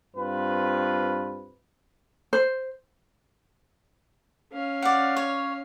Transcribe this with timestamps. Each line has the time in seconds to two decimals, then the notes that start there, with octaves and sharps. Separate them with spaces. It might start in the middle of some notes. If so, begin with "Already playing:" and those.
0.16 G2 C4 F4 B4
2.33 C5
4.52 C#4 F5
4.82 D5 F#5
5.17 C#5